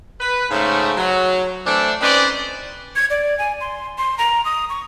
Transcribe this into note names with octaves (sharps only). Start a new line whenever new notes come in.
B4
G#2 C#3 A3
F#3
E3 A3 C4 D4
C4 C#4 D#4 B4 C5 D5
G#6
D5
G#5
C6
C6
A#5
D#6
C#6